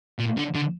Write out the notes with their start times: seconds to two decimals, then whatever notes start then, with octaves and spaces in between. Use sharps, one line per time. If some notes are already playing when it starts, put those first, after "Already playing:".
0.19 A#2
0.38 D3
0.55 D3